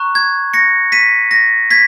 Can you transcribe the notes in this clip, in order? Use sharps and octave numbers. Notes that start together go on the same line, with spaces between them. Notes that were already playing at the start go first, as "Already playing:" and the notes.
Already playing: A#5 C#6 F#6
G#6
A#6 C#7
B6 D#7
A#6
G#6 B6